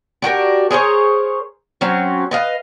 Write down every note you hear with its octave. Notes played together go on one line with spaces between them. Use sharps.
D4 F#4 G4 A#4
G#4 A#4 C5 C#5
F#3 C4 C#4
B4 D#5 F5